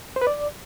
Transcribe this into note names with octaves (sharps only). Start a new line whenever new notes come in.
C5
B4
D5